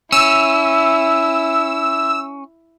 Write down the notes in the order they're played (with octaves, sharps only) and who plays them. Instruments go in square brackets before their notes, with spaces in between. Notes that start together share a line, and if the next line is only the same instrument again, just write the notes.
[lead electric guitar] C#4 [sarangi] E4 [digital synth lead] E6